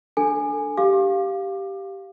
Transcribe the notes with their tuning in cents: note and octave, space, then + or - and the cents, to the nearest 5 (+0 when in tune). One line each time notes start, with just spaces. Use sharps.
D4 +0 A4 +0 G#5 +0
G4 -5 F5 +5 D6 +20